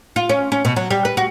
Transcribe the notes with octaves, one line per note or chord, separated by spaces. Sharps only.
F4
C#4
C#4
B2
F#3
G3
B4
F#4